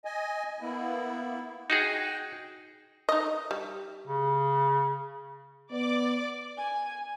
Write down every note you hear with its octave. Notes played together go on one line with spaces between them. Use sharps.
D#5 G#5
A#3 B3 E4
D#4 F#4 G#4 G5
D#4 D#5
G3
C#3
B3 D5 D6
G#5